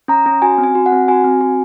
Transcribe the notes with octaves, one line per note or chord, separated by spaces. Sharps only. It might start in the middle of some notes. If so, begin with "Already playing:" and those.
C#4 A#5
C#4
F#4 G#5
C4
G#5
F#4
F#5
C4
F#4 G#5
C4
F#4